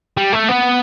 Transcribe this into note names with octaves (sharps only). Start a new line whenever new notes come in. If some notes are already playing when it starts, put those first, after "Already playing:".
G3
A3
B3